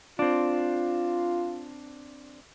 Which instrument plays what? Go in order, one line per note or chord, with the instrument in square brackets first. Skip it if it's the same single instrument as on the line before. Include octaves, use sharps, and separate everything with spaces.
[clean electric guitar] C4 D4 [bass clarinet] F4